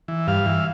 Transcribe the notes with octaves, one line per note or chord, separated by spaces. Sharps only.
E3
G2 F5
E3